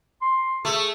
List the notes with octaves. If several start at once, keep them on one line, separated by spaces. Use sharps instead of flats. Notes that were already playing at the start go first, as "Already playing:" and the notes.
C6
A3 G#4